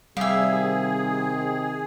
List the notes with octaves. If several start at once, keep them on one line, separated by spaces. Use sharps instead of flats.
C3 D#3 G3 G#4 E5 F5